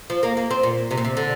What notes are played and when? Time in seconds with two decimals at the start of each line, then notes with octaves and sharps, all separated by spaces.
0.10 F3
0.23 A#3
0.37 A#3
0.51 C4
0.63 A#2
0.91 C3
0.97 A#2
1.05 C3
1.17 D3